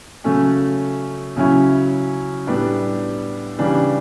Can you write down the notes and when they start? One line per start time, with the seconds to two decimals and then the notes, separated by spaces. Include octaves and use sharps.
0.24 C#3 F#3 A3 C#4
1.36 C#3 F#3 C#4 E4
2.47 A2 G3 B3 D4
3.59 C#3 E3 G3 D4